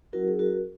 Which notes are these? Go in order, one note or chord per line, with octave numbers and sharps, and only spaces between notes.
F#3 C#4 E4 F#4 A#4
G#4
F#4 A#4